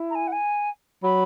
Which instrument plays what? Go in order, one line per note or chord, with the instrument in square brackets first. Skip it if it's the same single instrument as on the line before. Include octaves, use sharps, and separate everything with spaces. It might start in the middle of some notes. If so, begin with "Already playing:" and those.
Already playing: [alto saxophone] E4
[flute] A#5
G#5
F#5
G#5
[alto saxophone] F#3 [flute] B5